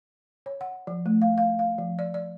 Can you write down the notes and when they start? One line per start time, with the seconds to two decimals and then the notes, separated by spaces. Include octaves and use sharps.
0.46 C#5
0.61 F#5
0.87 F3
1.06 A3
1.22 F5
1.38 F5
1.59 F5
1.78 F3
1.99 D5
2.14 D5